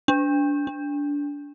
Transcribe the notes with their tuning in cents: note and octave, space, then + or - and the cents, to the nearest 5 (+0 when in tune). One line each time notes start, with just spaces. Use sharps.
D4 -25
D4 -20